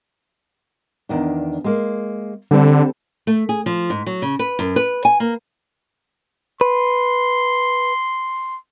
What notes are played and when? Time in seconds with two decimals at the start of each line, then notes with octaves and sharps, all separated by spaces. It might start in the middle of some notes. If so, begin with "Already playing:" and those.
1.09 E2 D#3 D4
1.64 G#3 A#3
2.51 D3 G3 C4 A4
3.27 A3
3.49 G#4
3.66 F3
3.90 G#2
4.06 F#3
4.22 C#3
4.39 B4
4.59 F#2
4.76 B4
5.05 G#5
5.20 A#3
6.61 B4 C6